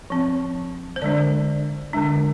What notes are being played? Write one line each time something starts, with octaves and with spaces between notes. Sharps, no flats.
F3 C4
C5
D3 G#3 D4 D5
D3 G#3 D4